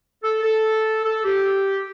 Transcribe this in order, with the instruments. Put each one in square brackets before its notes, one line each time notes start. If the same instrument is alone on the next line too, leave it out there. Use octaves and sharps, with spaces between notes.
[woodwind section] A4
A4
A4
G4